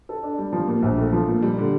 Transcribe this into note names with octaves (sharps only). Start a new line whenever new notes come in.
A4
D4
G3
F3
A#2
A#1
A3
F3
A#2
G3
D3